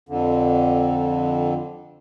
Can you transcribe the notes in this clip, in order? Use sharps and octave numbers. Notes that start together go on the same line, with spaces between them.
F2 D3